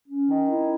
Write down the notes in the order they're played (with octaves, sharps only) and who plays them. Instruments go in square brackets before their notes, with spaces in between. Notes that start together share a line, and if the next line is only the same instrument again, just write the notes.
[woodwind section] C#4
D#3
E4